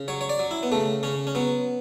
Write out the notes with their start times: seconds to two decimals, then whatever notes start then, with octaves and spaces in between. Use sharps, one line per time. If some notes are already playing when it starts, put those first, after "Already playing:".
Already playing: C#3
0.08 F#3 C#5
0.21 C#5
0.29 D5
0.39 F#3
0.51 E4
0.63 B3
0.72 C#3 A3
1.03 C#3 C#4
1.27 C#4
1.35 F#3 B3